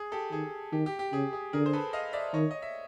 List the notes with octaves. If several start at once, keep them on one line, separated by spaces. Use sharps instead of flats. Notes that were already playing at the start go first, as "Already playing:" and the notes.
Already playing: G#4
G4 A4
D#3 G#4
D#3 G4
G4
G4
C#3 G#4
G#4
D3 G#4 A#4
C5
A4 B4
D#5 F5
D5 E5
D#3 C#5 D#5
D#5
E5